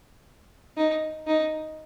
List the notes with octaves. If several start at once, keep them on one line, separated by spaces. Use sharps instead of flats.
D#4
D#4